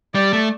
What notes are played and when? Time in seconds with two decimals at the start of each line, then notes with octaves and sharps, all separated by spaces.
0.14 G3 D5
0.33 A3